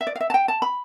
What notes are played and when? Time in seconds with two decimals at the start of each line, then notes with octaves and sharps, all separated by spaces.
0.01 E5
0.07 D5
0.16 F5
0.21 E5
0.30 A5
0.34 G5
0.48 A5
0.62 B5